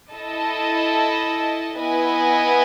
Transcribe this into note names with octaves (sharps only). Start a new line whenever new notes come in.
E4 A4 D#5 A5
B3 E4 B4 D#5 G#5